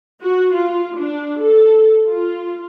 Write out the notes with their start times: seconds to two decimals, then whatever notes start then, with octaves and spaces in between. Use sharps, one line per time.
0.23 F#4
0.56 F4
0.98 D4
1.42 A4
2.09 F4